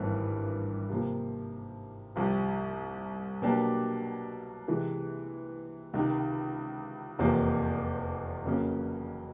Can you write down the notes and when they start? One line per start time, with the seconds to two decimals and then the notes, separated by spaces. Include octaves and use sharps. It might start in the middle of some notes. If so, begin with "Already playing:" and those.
Already playing: G#1 G2 E3 A3 C4
0.90 C3 F3 A#3
2.16 C2 C3 F3
3.42 B2 F#3 A#3 D4 G4
4.68 C3 E3 G#3
5.93 C#2 C3 D#3
7.19 F1 E2 C3 F3 A#3
8.45 F2 C#3 F#3 A#3 C#4